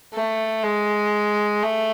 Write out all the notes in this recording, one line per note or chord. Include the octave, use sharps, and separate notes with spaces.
A3
G#3
A3